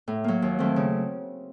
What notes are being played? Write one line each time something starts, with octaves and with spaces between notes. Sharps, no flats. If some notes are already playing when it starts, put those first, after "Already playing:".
A2
F#3 A#3
D#2
D#3 F#3 A3 C4
C#3